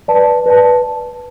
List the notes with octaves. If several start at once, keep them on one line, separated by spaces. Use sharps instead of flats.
B4 D5 A5
B4 D5 A5